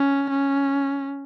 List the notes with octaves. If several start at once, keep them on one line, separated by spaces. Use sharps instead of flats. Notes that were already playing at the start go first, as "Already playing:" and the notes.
Already playing: C#4
C#4